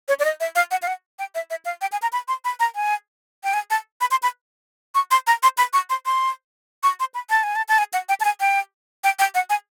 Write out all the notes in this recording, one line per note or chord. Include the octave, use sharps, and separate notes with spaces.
C#5
D5
D#5
E5
F5
F#5
F5
F#5
G5
E5
E5
F5
G5
G#5
A#5
B5
C6
B5
A#5
G#5
G5
G#5
A5
B5
C6
B5
C#6
C6
A#5
C6
B5
C#6
C6
C6
C#6
C6
B5
A5
G#5
A5
A5
G#5
F#5
G5
A5
G#5
G5
G5
G5
F#5
G#5